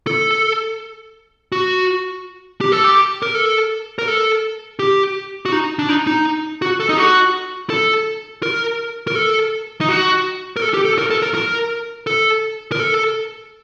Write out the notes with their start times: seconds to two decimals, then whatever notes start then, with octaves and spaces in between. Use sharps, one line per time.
0.07 A4
1.52 F#4
2.61 G4
2.72 A4
2.84 G4
3.22 A#4
3.35 A4
3.99 A#4
4.08 A4
4.79 G4
5.46 F#4
5.52 D#4
5.79 D4
5.89 D#4
6.07 D#4
6.62 F#4
6.80 A4
6.89 D#4
6.97 F#4
7.70 A4
8.43 A#4
9.07 A#4
9.15 A4
9.81 D#4
9.89 F#4
10.56 A#4
10.62 A4
10.74 G4
10.85 A4
10.98 A#4
11.10 A4
11.22 A#4
11.35 A#4
12.07 A4
12.72 A#4
12.80 A4